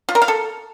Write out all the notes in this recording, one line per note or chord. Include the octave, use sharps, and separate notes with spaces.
F4
A#4
F5
A4